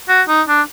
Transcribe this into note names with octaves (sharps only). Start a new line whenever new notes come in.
F#4
D#4
D4